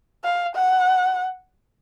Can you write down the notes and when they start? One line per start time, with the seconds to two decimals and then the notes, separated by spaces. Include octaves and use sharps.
0.24 F5
0.55 F#5